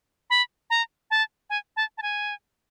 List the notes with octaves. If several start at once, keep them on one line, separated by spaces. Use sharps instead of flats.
B5
A#5
A5
G#5
A5
A5
G#5